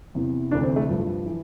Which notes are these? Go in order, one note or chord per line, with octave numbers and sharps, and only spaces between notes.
E2 C3 E3
D2 C3 E3 D4
C4
A3
G2 F3
E3